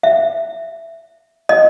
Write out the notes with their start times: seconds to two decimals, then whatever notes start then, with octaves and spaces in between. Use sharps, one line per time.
0.03 E5
1.49 D#5